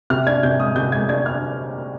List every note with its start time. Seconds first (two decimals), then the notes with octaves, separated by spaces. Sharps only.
0.10 C3 F6
0.27 D4 G#6
0.43 C3 G6
0.59 G#3 D#6
0.76 C3 G6
0.92 G#3 G#6
1.09 D4 G#6
1.26 D4 F6